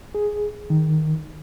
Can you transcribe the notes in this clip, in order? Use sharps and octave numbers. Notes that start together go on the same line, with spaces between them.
G#4
D#3